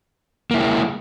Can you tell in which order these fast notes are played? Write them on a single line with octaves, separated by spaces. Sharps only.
A#3 E4 G#3